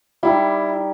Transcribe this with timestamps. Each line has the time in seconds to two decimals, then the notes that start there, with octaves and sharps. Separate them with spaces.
0.23 G3 D#4 E4 G4